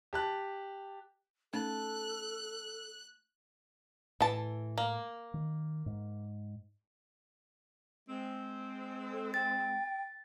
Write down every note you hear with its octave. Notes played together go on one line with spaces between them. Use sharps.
G4 A5 F#6
A3 C#4 D#4 A4 A5 F#6
A2 E3 A5
A#3
D#3
G#2
G#3 C4
A4
G5 A6